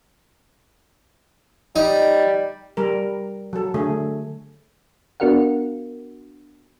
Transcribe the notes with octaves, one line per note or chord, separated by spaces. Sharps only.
G3 D#4
G3 A#4
F#3 A4
D3 A3 G#4
B3 D4 F#4 A#4 F5 F#5